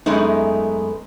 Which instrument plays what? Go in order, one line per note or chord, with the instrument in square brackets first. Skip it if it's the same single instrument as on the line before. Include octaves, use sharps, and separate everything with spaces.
[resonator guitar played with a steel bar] F#2 G#3 A3 B3 D#4